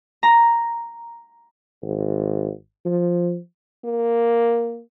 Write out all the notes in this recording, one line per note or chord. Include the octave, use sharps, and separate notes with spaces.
A#5
G#1
F3
A#3